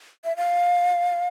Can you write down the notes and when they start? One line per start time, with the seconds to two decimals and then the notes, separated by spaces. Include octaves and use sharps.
0.25 E5
0.37 F5